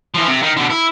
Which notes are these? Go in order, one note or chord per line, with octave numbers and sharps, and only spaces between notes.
E3 F3
C3
D#3
B2 D3
E4